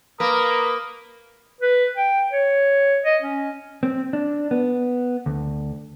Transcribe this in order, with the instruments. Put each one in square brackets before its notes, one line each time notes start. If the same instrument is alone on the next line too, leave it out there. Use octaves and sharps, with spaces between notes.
[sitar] A#3 [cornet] A#4 [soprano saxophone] B4 [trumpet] D#6
[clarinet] B4
G5
C#5
D#5
C#4
[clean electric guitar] C4
D4
B3
D2